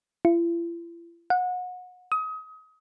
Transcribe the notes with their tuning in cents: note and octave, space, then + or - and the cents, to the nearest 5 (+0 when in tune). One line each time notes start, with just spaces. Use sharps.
E4 +45
F#5 -30
D#6 +30